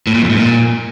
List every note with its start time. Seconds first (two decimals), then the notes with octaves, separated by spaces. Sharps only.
0.07 A2
0.14 A#2
0.22 F2
0.30 G#2
0.37 A#2